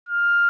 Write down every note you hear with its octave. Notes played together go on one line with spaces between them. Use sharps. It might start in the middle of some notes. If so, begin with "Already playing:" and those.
F6